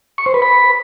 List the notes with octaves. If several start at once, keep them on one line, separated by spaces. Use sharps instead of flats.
C#6
C5
B4
B5